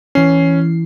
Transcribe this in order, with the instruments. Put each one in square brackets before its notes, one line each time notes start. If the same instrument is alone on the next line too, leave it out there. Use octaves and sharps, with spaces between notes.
[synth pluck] E3 C7 [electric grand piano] C#4